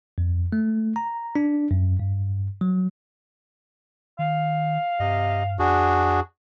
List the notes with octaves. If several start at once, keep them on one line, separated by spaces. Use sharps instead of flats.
F2
A3
A#5
D4
F#2
G2
F#3
D#3 F5
G2 C3 D#5
F2 D4 F#4 G#4